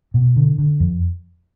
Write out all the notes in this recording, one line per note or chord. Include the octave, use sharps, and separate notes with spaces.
B2
D3
D3
F2